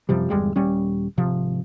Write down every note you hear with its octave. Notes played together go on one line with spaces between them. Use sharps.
F#2 C3 F3 G3
G1 E2 G3 G#3
D#1 G3 C#4
G#1 C3 F3